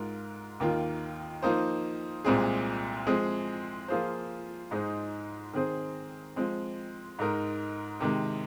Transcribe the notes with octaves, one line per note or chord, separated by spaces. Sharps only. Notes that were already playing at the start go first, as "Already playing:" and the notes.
Already playing: G#2 G#3 F4 A#4
D#2 D#3 A#3 F4
F3 A#3 D#4 C5
C2 A#2 G#3 C4 G#4
F3 G#3 C4 G#4
F3 A#3 F4 G#4 C5
G#2 G#3 D#4 G#4 C5
D#3 C4 G#4 C5
F3 G#3 C4
G#2 G#3 D#4 A#4
C3 D#3 G#3